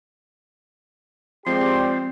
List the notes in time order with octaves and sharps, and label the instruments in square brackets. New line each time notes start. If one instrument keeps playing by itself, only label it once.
[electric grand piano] F3 [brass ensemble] G#3 G4 D5 [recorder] C4 [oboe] C6